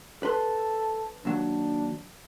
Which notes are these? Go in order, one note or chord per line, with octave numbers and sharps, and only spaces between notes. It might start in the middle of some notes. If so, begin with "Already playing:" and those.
A4 B4 C6
D#2 F#3 D4